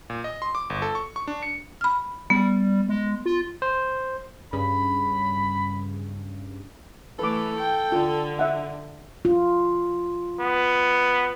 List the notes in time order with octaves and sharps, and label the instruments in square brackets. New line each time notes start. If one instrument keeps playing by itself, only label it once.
[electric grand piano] A#2
D#5
C6
D6
G1
A4
C#6
C#6
D4
C#7
[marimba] B5 F6
[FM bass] G3 [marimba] B3
[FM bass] G#3
F4
[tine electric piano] C5
[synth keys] G2 C#3 [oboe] B5
[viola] E3 A3 [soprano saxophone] A4 [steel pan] B4 D6
[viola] G5
[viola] D3 [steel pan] F4
[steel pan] E5 F#5
[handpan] F4
[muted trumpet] B3